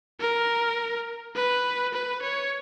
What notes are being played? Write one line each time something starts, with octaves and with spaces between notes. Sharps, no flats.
A#4
B4
B4
C#5